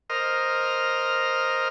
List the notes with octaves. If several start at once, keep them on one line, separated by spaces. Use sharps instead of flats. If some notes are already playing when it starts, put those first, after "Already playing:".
A#4 C5 D#5 F6